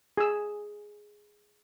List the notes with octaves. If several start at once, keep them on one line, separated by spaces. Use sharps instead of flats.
G#4 E6